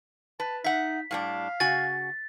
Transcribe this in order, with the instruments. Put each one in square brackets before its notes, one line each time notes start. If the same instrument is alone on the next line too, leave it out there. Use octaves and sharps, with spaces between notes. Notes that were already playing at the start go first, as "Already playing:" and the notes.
[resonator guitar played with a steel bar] B4 [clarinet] A5
[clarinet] D#4 [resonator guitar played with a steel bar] E5 F#5 [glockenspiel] B6
[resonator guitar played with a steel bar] A2 G3 D4 [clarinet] F5
[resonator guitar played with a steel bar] C#3 F#4 G#5 [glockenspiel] A6